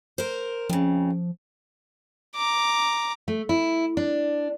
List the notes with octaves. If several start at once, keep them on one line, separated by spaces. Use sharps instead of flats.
A#4 C5
F2 C#3 F3
A#5 D6
A3
E4
D4